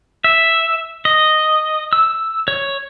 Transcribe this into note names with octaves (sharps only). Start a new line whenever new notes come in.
E5
D#5
E6
C#5